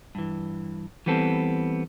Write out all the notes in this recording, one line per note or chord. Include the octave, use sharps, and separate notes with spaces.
G2 E3
E3 G3 B3 C4 A4